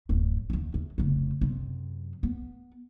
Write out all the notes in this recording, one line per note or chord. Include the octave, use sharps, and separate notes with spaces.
D1 F#2
D#2 D#3
E2
F1 C#3
F#2 C3
B3